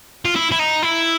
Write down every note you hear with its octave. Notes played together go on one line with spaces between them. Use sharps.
F4
E4
E4
D#4
E4